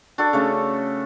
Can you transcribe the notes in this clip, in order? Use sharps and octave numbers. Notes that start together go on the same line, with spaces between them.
D4 F#4 A4
C#3 A3